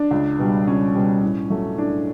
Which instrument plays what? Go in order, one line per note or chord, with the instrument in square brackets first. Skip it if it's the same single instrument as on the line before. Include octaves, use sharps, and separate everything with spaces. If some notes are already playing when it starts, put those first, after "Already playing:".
Already playing: [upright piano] D4
C#2
B2 G3
C#2 C#4
B2 G3
A2
F#3 A3
A2 D4